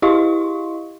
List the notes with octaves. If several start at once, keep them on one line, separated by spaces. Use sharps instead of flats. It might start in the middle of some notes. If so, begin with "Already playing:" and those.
E4 G4 D#5 F5 C6 C#6